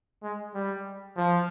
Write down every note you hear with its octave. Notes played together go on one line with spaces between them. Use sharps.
G#3
G3
F3